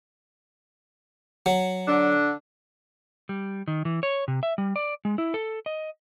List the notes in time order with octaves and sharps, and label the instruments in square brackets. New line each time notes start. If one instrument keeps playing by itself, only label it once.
[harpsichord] F#3
[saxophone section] D3 D4
[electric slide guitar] G3
D#3
E3
C#5
C3
E5
G3
D5
G#3
E4
A4
D#5